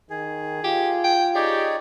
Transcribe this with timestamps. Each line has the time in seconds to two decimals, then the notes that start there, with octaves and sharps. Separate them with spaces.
0.10 D#3 G#4
0.64 F4 G4
1.04 G5
1.35 D#4 G4 G#4 C#5 D5